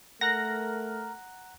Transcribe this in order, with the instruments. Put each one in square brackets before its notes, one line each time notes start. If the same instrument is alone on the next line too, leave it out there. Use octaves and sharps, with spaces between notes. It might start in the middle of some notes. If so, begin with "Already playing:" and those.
[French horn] A3 [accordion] A#4 [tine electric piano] F#5 A#5 F#6 [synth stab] A#6